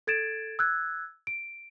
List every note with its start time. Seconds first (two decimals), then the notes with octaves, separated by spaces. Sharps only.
0.07 A4 G#6 A6 D7 E7
0.59 E6 F#6 G#6
1.27 D7